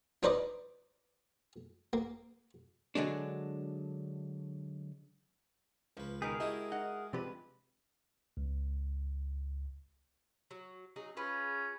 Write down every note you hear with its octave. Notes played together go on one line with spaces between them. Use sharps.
D4 D#4 B4 C5 D5 D#5
A#3
D3 F#3 G#3 D4
C#2 F3 B4
B2 D#3 G#4 A#4 G5 B5
G#3 E4 F#4 G4 D#5 A5
D#4 F#5
G2 C3 F3 G3 B4
C#2
F#3
F#3 D#4 G#4
C#4 F4 G#4 B4